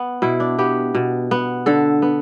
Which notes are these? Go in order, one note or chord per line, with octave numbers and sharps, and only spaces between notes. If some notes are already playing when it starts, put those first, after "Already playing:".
Already playing: B3
B2 E4
D4
B3 G4
B2
B3
D3 A4
B3